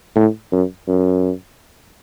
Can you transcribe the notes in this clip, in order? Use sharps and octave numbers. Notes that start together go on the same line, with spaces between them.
A2
F#2
F#2